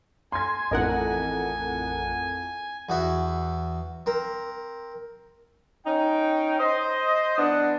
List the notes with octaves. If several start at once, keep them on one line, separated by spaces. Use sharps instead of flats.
G#5 C6 G#6
A1 F2 E4 A#4 D#5 F#5
E2 F#4 E5
C4 A#4
C#4 D#4 G5
C5 D#5
E3 B3 D4 D#5 F#5